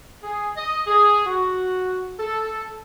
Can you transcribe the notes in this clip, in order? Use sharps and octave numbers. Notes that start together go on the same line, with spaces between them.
G#4
D#5
G#4
F#4
A4